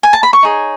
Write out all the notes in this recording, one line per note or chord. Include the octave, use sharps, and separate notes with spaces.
G#5
A5
B5
C#6
D#4 G#4 C#5